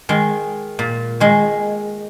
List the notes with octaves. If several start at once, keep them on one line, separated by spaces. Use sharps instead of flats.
D#3 G#3
A#2
D#3 G#3